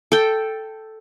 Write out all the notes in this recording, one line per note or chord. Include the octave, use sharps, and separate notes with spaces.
A4 G5